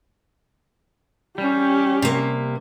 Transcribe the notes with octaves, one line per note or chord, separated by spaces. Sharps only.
G3 C#4 G4
C3 A#3